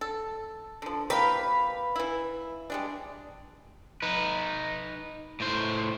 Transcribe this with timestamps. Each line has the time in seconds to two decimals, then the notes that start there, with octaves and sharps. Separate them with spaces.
0.01 A4
0.82 D3 F3
1.10 A#3 E4 G4 B4 F5
1.96 E3 E4
2.70 G3 G#3 D4
4.02 D#4 B4
5.40 A2 C5